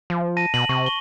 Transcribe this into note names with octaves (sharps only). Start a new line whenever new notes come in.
F3
A5 A#6 D#7
B2 F#7
C3 C#6
G7